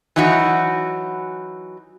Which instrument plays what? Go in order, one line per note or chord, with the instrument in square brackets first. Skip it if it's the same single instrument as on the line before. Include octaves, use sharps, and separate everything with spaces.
[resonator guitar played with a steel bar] E3 F#3 D#4 E4 F#4